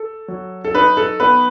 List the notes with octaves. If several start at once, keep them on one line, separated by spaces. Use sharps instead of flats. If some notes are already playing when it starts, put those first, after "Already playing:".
Already playing: A4
F#3
A4
D#4 B4
A4
B3 B4